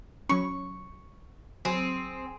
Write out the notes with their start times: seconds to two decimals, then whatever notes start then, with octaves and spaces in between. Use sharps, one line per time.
0.29 F#3 C#4 C#6
1.65 F#3 C4 G#4